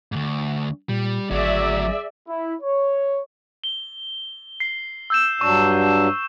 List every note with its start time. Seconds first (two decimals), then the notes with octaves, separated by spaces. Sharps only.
0.12 D2 G#2
0.89 A#2 G3
1.31 G#1 D2 F#3 G#4 D5 E5
2.28 E4
2.62 C#5
3.64 G7
4.60 C7
5.10 E6 G6 E7
5.41 G2 F#3 D4 C#6